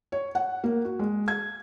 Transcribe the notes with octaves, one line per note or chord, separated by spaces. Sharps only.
C#5
F#5
A#3
F#4
G#3
G#6